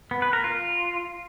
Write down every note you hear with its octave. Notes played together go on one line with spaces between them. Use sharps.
B3
B4
A#4
F4